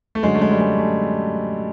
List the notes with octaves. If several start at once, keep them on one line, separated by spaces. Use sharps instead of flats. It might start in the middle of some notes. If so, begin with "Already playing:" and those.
A3
F#2 D3 F#3 G#3
A3
G#3
G3
G#3
A3